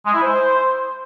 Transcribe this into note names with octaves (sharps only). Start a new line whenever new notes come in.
G#3
E4
C5